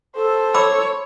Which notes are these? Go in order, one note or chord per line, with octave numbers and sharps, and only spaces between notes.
A4 C5 A5
C#5 B5 D6 E6